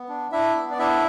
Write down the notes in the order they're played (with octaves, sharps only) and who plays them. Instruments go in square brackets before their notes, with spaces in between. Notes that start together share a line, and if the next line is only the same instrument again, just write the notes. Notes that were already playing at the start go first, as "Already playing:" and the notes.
Already playing: [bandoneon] B3
D4
D4 E4 E5
B3
D5
D4 E4 E5